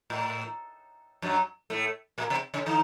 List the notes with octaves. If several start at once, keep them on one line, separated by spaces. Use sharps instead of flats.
A2
F#2 F#3
A2 A3
A#2 A#3
C3 C4
C#3 C#4
D#3 D#4